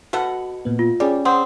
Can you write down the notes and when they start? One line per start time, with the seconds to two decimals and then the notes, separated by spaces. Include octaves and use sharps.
0.13 B2 F#4 A4 F#5
0.65 A#2 B3
0.79 F4
1.00 G3 C#4 G#4 D5
1.25 C4 F#5 C6 D#6